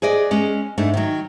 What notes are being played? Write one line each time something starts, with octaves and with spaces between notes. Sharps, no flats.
G#4 B4 D5 D#5
G#3 C#4
G#2 A3 D4
D#3 F#3